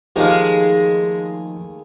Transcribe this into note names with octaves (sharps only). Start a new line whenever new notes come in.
D#2 F3 G#3 A3 D#4 F4 G4 F5